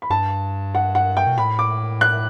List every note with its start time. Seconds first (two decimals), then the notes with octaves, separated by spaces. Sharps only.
0.02 B5
0.10 G2 A5
0.75 F#5
0.95 F#5
1.17 G5
1.27 B2
1.38 A2 B5
1.59 D6
2.01 F#6